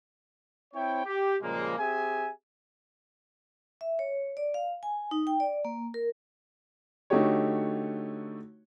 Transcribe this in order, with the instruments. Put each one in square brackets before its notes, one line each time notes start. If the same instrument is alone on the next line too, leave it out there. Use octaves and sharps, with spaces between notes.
[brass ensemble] C4 E4 C#5 G5
G4
A#2 C#3 F3 G3 G#3 A#3
C4 G4 G#4 E5 G#5
[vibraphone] E5
C#5
D5
F5
G#5
D#4
G5
D5
A#3
A#4
[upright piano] D3 A3 D#4 F#4 G4 C#5